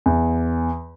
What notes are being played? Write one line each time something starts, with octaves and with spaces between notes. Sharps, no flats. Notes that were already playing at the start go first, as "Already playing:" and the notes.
E2